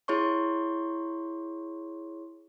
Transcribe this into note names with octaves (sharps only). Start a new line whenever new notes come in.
E4 G#4 C#5 C6 C#6